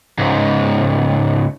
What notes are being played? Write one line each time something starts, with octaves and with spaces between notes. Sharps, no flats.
C#2 G#2